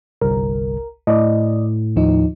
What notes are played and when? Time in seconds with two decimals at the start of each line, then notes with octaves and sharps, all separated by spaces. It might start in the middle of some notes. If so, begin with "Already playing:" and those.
0.21 G1 C2 A#4
1.07 A2 D5 D#5
1.96 D#2 F3 D#4